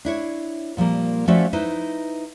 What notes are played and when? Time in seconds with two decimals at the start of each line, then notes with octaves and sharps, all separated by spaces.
0.05 D4 E4 C#5
0.77 A#2 F3 G3 A#3
1.28 F3 A3 C#4 F#4 D5 E5
1.53 D#4 E4 B4 C5